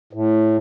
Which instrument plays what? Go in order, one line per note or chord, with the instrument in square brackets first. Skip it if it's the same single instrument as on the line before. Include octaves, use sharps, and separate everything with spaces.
[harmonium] A2